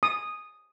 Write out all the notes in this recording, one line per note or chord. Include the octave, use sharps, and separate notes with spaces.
D#6